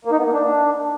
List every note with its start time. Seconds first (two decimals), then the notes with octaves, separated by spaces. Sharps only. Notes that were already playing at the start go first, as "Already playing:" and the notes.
0.05 A#3
0.12 D#4
0.19 B3
0.26 A#3
0.33 D4